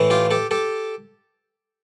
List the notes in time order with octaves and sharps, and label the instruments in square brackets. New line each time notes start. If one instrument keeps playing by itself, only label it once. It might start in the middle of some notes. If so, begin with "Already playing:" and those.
Already playing: [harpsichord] A2 E3 A3
F4 G4
G4 A4
G4 A4